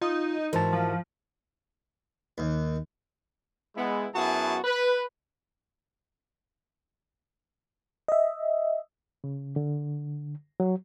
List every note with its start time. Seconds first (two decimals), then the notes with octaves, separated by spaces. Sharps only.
0.01 D#4 F4
0.53 G#2 E3 F#4 A#4 C5 A5
0.73 F3
2.38 D#2
3.77 G#3 B3 E4
4.14 F#2 B3 E4 F#4 G#4 A5
4.64 B4
8.08 D#5 E5
9.24 C#3
9.56 D3
10.60 F#3